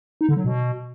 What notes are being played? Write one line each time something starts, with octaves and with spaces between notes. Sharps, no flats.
D#4
D3
F#3
B2